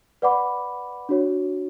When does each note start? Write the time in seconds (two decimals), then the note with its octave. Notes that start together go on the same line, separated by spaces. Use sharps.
0.22 B4 D5 F#5 B5 D6
1.09 D4 F#4 C#5